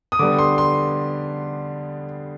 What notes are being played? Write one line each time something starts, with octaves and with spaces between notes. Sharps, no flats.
D#6
D3 G3 B3 D6
C6
C6